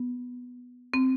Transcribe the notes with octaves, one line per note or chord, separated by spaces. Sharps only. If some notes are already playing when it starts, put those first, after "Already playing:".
Already playing: B3
C4